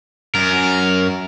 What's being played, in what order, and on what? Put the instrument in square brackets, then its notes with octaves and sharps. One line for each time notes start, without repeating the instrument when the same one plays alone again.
[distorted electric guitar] F#2 [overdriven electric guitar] A#4